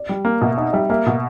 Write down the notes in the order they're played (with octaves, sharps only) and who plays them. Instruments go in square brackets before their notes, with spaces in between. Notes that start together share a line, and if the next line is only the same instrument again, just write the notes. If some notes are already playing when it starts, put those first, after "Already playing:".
Already playing: [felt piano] D5
[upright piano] G3
A#3
[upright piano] B2 [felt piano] E5
[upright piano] D#4 [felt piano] E5
[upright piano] G3 [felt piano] E5
[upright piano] A#3 [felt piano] E5
[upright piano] B2